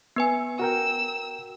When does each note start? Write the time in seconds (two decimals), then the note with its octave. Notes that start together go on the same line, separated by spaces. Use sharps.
0.16 B3 B4 G#5
0.59 F#4 A#4 G5 E6